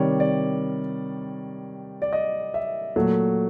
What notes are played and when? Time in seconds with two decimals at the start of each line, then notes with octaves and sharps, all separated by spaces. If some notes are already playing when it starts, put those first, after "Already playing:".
Already playing: C3 D#3 G3 C#5 D5
0.20 D5
2.02 D5
2.13 D#5
2.54 E5
2.96 A#2 F#3 A3